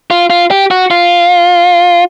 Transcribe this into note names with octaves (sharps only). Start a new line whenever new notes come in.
F4
F4
G4
F#4
F4